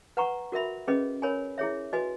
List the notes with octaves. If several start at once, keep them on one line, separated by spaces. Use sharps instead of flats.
B4 F#5 A#5 C#6
F#4 A#4 E5 B5
C#4 G#4 B4 D#5
A#4 C#5 G#5 B5
E4 G#4 C#5 E5
F#4 B4 D#5 G#5